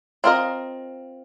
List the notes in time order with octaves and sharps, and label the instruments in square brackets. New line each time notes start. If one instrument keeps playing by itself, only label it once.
[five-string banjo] C4 F4 A#4 D#5